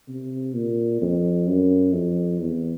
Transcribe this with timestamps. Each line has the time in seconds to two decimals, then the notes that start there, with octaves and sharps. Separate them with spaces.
0.08 C3
0.54 A#2
1.02 F2
1.48 F#2
1.93 F2
2.40 E2